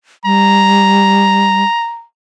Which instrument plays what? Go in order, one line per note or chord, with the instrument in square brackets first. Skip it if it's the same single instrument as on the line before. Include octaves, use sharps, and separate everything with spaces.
[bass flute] G3 [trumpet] A#5